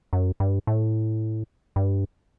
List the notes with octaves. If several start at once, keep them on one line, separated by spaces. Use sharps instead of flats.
F#2
G2
A2
G2